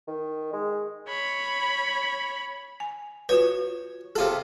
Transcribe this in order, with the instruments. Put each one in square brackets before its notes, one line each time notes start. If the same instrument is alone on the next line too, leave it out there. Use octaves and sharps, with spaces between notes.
[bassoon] D#3
G#3
[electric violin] C#5 B5
[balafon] G#5
[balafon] F4 F#4 B4 [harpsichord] C#5
[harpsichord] C3 F4 A4 [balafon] G#4 F5